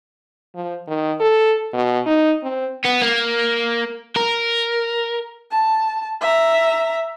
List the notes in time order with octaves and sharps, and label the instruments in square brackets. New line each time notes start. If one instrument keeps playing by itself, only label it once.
[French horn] F3
D#3
A4
B2
D#4
C4
[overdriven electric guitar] B3
A#3
A#4
[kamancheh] A5
E5 A#5